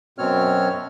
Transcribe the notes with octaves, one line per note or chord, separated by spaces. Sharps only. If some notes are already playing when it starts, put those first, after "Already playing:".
F#2 B2 C4 C#5 F6